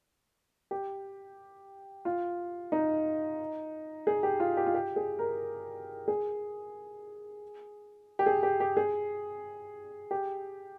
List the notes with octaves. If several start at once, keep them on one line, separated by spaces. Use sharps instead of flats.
G4
F4
D#4
G#4
G4
F4
G4
F4
G4
G#4
A#4
G#4
G4
G#4
G4
G4
G#4
G4